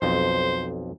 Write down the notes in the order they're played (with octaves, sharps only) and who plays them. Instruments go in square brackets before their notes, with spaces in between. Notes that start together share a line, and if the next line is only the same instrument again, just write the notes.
[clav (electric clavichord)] B1 F2 [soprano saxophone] C5